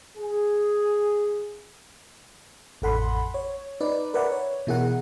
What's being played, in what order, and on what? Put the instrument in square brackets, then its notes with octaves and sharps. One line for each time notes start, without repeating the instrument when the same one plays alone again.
[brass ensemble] G#4
[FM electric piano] A1 F2 A4 F#5 B5 C6
C#5
D#4 B4 D5
A#4 B4 D5 E5 F#5
C#5
B2 E3 E4 G#4 A#4 F#5